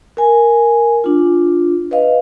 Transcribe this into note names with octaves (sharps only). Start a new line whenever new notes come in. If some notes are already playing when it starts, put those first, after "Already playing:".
A#4 G#5
D4 F4
B4 D#5 F5